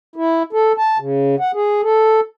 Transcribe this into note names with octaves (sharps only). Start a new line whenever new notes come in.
E4
A4
A5
C#3
F#5
G#4
A4